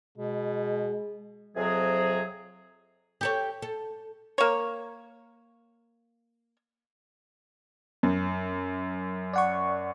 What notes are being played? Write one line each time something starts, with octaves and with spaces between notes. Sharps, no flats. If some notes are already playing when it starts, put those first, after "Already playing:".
B2 G#3
F2 C3 F#3 G#4
G4 A4 C#5
A4
A#3 C#5
F#2
D5 F#5 C#6